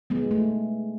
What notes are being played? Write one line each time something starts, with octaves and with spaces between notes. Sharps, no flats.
G#3 B3
A3